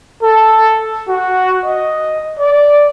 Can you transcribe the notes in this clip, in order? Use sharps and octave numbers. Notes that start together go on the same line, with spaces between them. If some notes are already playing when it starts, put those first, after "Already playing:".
A4
F#4
D#5
D5